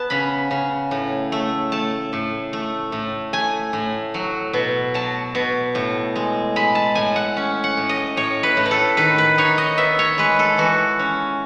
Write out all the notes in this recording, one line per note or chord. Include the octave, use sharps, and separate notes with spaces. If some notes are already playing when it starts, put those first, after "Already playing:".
Already playing: B3 A5
C#3 B5
C#3
A2
A3
A3 A5
A2
A3
A2
A3 G#5
A2
F#3
B2
F#3 A5
B2
A2
G#3
G#3 B5
A5
A2 G#5
F#5
C#4
F#5
A2
D#5
A2 C#5
B4
A2
B4
A4
D#3 B4
B4
D#4 C#5
D#5
B3 E5
C#5
G#3 B4
A4
E3 F#4
C#4